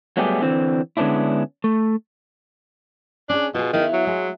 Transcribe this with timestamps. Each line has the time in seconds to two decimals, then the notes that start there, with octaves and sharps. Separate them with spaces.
0.17 F#3 G3 A3 B3 G4 G#4
0.41 D3 E3 C4
0.97 D3 G#3 B3 C#4 D4 E4
1.64 A3
3.29 C#4 D4 G#4
3.55 B2 F4 G#4
3.73 D#3 B3 E4 F5
3.94 F#3
4.07 G#3